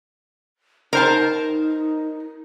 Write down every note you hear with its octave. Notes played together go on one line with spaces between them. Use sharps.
D#4 A#4 C5 A5